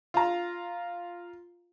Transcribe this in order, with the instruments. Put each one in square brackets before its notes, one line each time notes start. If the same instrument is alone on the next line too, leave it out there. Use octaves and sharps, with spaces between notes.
[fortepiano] F4 A#5